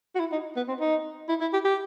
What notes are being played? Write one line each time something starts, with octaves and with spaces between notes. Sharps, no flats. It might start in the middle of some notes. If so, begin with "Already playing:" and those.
F#4
E4
D#4
B3
C4
D#4
E4
E4
G4
G4